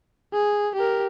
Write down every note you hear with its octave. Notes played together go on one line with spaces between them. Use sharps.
G#4
G4 A#4